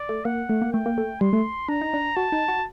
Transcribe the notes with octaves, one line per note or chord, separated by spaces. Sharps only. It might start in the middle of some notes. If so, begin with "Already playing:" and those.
Already playing: D5
A3
A#3 F#5
A3
A#3
A3 G5
A#3
A3
G3 C6
A3
D4 A#5
D#4
D4
F#4 A5
D#4
F#4